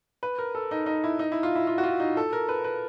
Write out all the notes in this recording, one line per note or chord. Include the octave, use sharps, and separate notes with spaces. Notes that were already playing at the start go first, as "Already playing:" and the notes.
B4
A#4
A4
D#4
D#4
E4
D#4
E4
F4
E4
F4
F#4
F4
D#4
A4
A#4
B4
B4